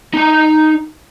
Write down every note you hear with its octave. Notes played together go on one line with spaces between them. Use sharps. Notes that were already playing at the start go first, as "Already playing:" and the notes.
D#4 A#5